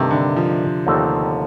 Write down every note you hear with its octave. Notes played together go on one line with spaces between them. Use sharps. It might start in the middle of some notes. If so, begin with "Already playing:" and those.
Already playing: G2 C3 D#3 A3
D3
F3
D#2 D3 A3 C4 D#4